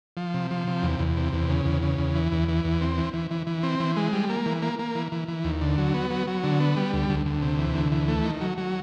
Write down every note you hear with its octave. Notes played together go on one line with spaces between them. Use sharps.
F3
C3
F3
C3
E2
E2
C3
E2
C#3
E2
C#3
E2
E3
E2
E3
E2
C4
E3
E3
E3
E3
C4
E3
G#3
G3
A#3
E3
A#3
A#3
E3
E3
E3
D#2
D3
F#3
B3
F#3
F#3
D3
B3
G3
D2
D2
D2
C3
E3
D2
E3
A3
D#3
F#3
F#3